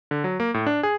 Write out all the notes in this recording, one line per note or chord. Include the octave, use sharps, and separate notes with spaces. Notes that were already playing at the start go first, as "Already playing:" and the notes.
D3
F#3
A#3
A2
D4
G#4